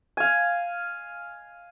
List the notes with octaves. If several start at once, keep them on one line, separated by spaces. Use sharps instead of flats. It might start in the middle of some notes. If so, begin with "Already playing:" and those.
F5 G#5